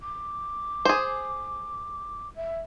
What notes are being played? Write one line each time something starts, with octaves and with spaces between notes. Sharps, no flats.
D6
G#4 C5
E5